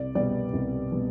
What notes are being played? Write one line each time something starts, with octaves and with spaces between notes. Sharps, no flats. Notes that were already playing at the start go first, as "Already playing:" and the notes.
Already playing: C2 D5
B2 G3 D5
C2
B2 G3